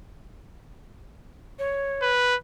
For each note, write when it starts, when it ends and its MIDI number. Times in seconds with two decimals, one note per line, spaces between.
1.59 2.11 73
2.02 2.36 71